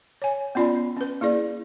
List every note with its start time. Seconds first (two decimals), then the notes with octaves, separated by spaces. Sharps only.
0.22 C#5 G#5
0.55 B3 C#4 F4 D5 B5
0.97 C#4 B4
1.21 A#3 E4 G#4 D5